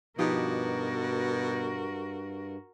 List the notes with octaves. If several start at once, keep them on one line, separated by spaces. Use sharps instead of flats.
G2 B2 F3 D#4 F#4 G4 A#4